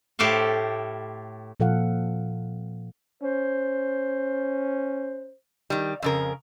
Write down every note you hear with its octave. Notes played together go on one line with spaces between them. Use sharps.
A2 G4 A4 C5 F5
A#2 F3 A4 F5 F#5
C#4 C5
D#3 G3
F2 C#3 A#4